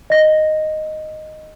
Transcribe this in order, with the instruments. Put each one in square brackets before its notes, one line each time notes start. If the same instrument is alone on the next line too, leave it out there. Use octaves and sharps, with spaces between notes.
[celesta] D#5 A#6